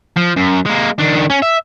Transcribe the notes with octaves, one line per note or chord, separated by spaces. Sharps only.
F3
F#2
G#3 A#3
D#3 D4
C#4
E5